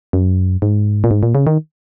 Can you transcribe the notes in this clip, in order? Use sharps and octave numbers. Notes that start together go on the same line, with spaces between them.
F#2
G#2
A#2
G#2
A#2
C#3
D#3